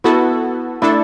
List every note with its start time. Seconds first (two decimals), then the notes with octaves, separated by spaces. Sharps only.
0.04 B3 E4 F#4 A4
0.82 A3 D4 E4 A4